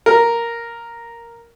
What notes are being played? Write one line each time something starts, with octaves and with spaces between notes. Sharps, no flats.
A#4